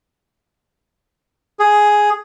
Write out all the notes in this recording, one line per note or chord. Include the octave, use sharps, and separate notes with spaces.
G#4